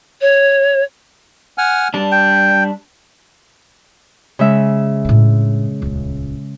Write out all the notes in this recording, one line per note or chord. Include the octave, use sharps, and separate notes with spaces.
C#5
F#5 G#5 F6
G3 D4 A5
G5
C#3 G#3 E5
A2 D4
D#1 C#2